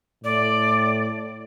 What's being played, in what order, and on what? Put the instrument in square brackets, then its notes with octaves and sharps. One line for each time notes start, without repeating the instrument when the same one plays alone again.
[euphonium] A2 [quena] D5